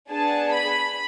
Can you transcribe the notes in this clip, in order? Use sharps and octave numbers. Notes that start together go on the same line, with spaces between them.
B3 D4 G#4 A5
B5